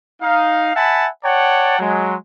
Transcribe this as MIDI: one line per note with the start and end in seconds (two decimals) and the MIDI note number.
0.22 0.74 63
0.22 0.74 77
0.76 1.08 76
0.76 1.08 78
0.76 1.08 80
0.76 1.08 81
0.76 1.08 83
1.24 1.77 73
1.24 1.77 74
1.24 1.77 78
1.24 1.77 79
1.24 1.77 81
1.79 2.16 54
1.79 2.16 56